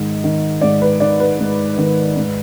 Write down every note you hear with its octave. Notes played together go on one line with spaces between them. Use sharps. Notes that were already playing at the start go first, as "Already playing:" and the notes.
Already playing: G#2 D#3 D#5
D#3
G#2 D5
B4
D#3 D5
B4
G#2
D#3
G#2